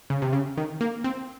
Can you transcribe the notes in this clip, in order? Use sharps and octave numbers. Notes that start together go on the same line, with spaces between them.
C#3
C3
C#3
D#3
A#3
C4